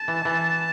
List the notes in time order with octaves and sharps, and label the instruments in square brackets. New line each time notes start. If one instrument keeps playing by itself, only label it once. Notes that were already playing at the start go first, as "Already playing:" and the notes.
Already playing: [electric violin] A5
[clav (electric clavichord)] E3
E3